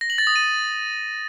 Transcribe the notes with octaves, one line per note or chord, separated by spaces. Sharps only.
A#6
F#7
A6
D#6
D#7